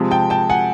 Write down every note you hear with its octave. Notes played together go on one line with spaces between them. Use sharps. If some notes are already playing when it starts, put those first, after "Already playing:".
Already playing: C3 F3 G#3
G5 A5
G5 A5
F#5 G#5